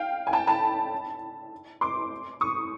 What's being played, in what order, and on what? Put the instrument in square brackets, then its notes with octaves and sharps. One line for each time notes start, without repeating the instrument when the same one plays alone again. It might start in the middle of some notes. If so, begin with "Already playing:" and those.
Already playing: [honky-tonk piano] F5 G5
G#5
G5 A5
A5 B5
C6 D6
C#6 D#6